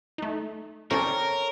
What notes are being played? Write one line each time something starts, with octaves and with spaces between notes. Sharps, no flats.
A3 D#4
C4 C#4 A4 A#4 C#5 D5 G5 A5